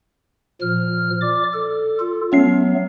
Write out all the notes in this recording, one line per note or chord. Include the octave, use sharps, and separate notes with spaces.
A#2 F3 F6
D5 D6
A4
F4 A4
F#3 A3 B3 C#4 C7